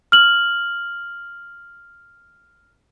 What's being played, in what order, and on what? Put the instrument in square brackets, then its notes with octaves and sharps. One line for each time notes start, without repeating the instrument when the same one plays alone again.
[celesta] F6 F#7